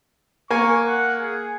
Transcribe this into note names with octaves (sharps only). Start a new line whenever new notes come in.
A#3 G#5 C#6
F#5
G#4